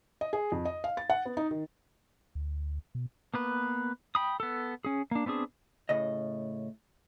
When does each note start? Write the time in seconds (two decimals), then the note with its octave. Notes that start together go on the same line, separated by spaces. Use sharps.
0.21 D#5
0.33 G#4
0.52 F2
0.65 D#5
0.84 F5
0.97 A6
1.10 F#5
1.25 B3
1.37 D#4
1.51 D#3
2.35 D2
2.95 B2
3.34 A#3 B3 B4
4.15 G5 B5 D#6
4.40 B3 A4
4.85 C#4 G#4
5.11 A#3 D4
5.26 B3 C4 D4 G#4
5.89 A2 C#3 D#5